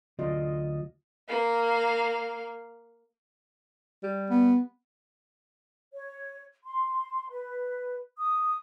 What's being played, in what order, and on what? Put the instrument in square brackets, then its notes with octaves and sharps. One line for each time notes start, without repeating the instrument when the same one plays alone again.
[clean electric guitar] D2 F4 D5 [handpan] F#3 D#5
[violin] A#3 F5
[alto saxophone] G3
[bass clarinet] B3
[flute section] C#5
C6
B4
D#6